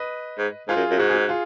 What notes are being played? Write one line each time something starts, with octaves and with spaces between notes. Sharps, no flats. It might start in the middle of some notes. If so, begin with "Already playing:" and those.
Already playing: B4 D#5
G#2
G#2 F4 G#4
F#2
F#2
G#2 F#4
G#4
F#4
F4 G#4